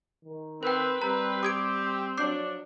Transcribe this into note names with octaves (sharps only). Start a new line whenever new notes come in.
D#3
C4 A#4 B4 G5
G3 C4 A#5
G4 D#6 G#6 D7
F3 F#3 D4 D6 G6 C7